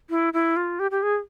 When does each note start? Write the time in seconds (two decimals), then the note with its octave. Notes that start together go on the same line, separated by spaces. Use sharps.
0.10 E4
0.33 E4
0.56 F4
0.79 G4
0.91 G4
1.03 G#4